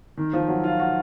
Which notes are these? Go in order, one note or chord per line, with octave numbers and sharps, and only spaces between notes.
D#3
F3
F#3
F4
F#4